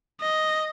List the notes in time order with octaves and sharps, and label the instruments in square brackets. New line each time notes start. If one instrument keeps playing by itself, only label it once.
[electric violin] D#5